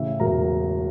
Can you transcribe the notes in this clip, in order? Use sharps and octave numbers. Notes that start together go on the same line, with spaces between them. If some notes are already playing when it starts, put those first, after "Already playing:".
Already playing: A1 A2 C#3 E5
E1 A#4 A#5